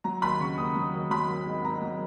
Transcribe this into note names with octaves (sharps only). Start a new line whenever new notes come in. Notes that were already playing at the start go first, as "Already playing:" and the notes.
F#3 A#5
D#2 B5
C#3 C#6
D#2 D#6
F#3
D#2
F#3 B5
G#1
G#2
G#1 A#5
F#3